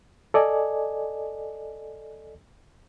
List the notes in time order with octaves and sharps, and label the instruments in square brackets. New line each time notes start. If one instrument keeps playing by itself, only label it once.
[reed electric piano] A4 D5 D#5 G#5